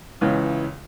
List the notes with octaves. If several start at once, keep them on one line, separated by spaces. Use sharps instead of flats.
C#2 C#3 E3